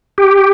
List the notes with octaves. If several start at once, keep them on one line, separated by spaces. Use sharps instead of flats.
G4